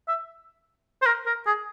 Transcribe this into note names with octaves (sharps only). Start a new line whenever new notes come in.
E5
C5
A#4
A#4
G#4